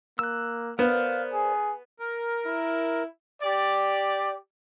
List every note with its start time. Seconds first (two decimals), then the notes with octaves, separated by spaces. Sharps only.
0.19 A#3 E6 F#6
0.79 B3 A#4 C5 D5 F5
1.33 G#4
2.00 A#4
2.46 E4
3.43 G4 D5